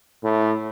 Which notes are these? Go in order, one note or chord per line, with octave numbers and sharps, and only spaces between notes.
A2